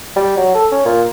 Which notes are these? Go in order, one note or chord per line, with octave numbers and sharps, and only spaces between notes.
G3
F#3
A4
C#4
A#2